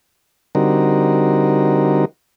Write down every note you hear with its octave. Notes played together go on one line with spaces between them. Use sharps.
D3 G3 C4 D#4 F#4 A#4